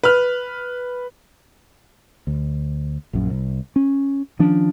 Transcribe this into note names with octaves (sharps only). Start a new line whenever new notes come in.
B4 F6
D2
A#1 F#2
C2
C#4
D#3 F3 C#4 D4